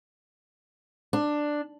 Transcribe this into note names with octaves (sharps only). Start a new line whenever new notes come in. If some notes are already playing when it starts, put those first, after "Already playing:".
D4